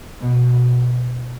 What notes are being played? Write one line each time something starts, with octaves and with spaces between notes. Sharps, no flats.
B2